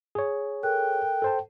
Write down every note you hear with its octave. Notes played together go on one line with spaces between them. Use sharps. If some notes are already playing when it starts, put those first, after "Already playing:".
G#4 C#5
A4 A#4 G5 F#6
A4 C5 A5